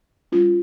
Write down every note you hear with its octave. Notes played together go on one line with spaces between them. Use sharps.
G3 C#4 F4